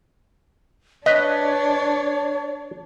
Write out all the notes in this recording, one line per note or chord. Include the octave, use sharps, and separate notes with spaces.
D4 B4 C#5 D#5